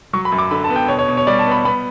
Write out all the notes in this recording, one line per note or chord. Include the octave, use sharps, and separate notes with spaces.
F#3 C#6
B5
F#2
D6
D3 B5
A5
B3
G5
B2 C#5
C#5
B2
C#5
G3 D5
A5
B3
B5
B3 B5